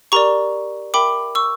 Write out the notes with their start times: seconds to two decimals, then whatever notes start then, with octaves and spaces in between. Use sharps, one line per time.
0.12 G4 A#4 D5 A#5 C#6
0.94 A#4 E5 G5 B5 D6
1.35 C#6 E6